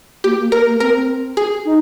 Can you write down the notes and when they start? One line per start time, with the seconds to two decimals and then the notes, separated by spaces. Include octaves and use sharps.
0.24 A#3 G4
0.38 A#3
0.52 A#4
0.66 A#3
0.80 C4 A#4
1.37 G#4
1.65 D#4